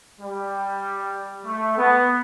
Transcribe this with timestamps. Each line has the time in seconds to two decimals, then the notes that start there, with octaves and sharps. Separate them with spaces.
0.20 G3
1.45 A3
1.77 B3